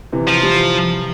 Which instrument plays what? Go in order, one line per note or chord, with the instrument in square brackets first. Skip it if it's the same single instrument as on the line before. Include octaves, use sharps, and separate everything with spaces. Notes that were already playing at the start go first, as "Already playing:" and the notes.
[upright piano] C3 E3
[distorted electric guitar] F3
[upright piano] E3 G3